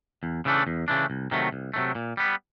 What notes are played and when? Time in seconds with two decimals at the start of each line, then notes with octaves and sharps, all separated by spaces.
0.23 E2
0.45 C#3 E3 A3 D4
0.67 E2
0.88 C#3 E3 A3 D4
1.10 C2
1.31 C3 D#3 F#3 A3
1.53 C2
1.74 C3 D#3 F#3 A3
1.95 A#2
2.17 G3 B3